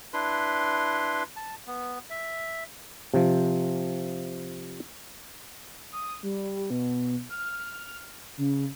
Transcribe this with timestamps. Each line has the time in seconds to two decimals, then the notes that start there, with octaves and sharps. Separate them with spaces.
0.13 D4 E4 B4 C6
1.36 A5
1.67 B3
2.10 E5
3.14 C3 F3
5.92 D#6
6.23 G3
6.70 B2
7.30 F6
8.38 C#3